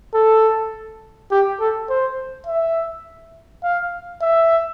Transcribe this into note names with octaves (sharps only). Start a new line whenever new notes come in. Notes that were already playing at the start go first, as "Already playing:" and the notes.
A4
G4
A4
C5
E5
F5
E5